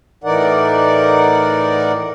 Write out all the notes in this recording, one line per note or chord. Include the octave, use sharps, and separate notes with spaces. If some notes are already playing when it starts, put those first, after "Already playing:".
A2 E3 D#4 A#4 D5 F#5